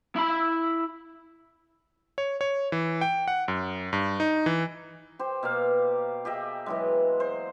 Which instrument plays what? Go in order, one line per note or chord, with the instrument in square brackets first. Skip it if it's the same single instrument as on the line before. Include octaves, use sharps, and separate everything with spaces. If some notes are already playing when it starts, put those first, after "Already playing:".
[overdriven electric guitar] E4 B5
[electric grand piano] C#5
C#5
E3
G5
F#5
F#2
G2
D#4
E3
[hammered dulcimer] G4 C5
B2 A#3 F5
G4 G#4 D#5 E5
E3 F#3 G#3
C5